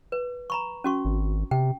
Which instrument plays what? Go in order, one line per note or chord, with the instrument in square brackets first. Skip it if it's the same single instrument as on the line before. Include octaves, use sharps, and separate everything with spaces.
[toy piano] B4
A#5 B5 C#6
C#4 F#4 C#6
[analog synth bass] G#1
[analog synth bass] C3 [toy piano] G5